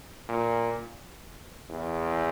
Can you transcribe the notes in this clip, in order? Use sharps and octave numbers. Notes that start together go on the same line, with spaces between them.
A#2
E2